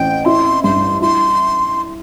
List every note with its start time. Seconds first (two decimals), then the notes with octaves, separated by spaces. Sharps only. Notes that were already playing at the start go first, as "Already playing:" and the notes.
Already playing: A1 C4 G5
0.25 E4 C6
0.64 G2 C6
1.02 E4 C6